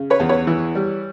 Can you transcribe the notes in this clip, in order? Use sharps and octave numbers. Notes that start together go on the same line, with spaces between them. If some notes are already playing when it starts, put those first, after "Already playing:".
Already playing: C#3
B4 C#5
E2
B4 C#5
E3
G3